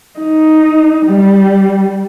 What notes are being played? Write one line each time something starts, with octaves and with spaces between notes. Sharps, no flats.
D#4
G3